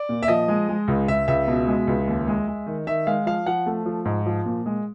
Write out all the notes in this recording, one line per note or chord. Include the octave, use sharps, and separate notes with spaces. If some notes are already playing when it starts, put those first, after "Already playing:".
Already playing: D5
A#2
E5
F3 D#5
G#3
G#3
C#2
C#2 E5
C#2 E5
B2
G#3
C#2
D#2
G#3
G#3
D#3
D#3 E5
G#3 F5
F3 F5
F3 F#5
A3
F3
G#2
F3
A#2
G#3